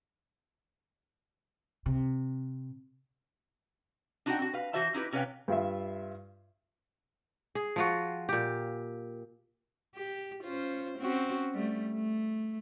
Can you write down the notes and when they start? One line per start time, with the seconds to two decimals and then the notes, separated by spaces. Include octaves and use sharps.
1.86 C3
4.26 D4 D#4 F#4 F#5 G5
4.39 C4 F#4
4.54 B4 F5
4.73 E3 F#4 C5 E5 A5
4.94 D#4 E4 G4 B4
5.13 C3 C#4 B4 C#5 F5 G5
5.48 G2 F4 E5
7.55 G#4
7.76 F3 F4 F#4
8.29 A#2 G4
9.96 G4
10.43 C#4 F4 C5
10.99 C4 C#4 F#4
11.54 G3 A3
11.92 A3